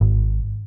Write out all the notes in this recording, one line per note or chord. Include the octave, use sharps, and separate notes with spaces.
G#1